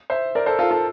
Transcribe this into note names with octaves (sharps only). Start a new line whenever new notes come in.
C5 E5
A#4 D5
A4 C5
F4 A4
F4 A4